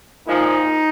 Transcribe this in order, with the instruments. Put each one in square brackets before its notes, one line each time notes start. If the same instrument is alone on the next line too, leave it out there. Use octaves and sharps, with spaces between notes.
[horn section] A#2 F3 G#3 D#4